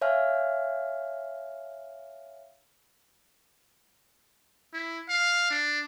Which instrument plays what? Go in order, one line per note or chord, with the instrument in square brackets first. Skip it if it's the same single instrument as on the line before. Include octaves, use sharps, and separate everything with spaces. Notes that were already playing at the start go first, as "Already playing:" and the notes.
[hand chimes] C#5 E5 F5 G#5 F6
[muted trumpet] E4
F5
D4